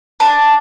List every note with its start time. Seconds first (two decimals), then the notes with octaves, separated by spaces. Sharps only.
0.20 D4